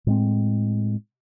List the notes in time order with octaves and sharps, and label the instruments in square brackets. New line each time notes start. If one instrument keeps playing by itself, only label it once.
[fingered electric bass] A2 G#3 C4